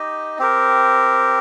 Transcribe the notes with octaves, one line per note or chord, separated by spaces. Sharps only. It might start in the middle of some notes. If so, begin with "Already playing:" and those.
Already playing: D#4 G4 D#5
C4 G4 A#4